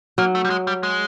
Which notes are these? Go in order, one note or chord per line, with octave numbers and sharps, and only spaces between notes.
F#3 A#3
A3
G3
G#3
G3
G#3